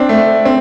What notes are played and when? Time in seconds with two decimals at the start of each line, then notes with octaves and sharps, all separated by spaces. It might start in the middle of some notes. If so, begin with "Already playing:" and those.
Already playing: C4 D4
0.09 A3
0.45 C4